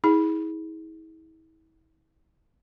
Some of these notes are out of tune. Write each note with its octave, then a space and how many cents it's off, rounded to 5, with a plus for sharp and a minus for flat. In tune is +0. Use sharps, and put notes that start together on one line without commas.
E4 -40 G#4 +0